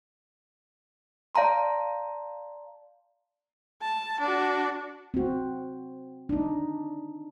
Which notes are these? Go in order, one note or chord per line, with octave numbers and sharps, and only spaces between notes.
D5 F5 A5 A#5 C6
A5
D4 F#4
C4 F#4
D4 D#4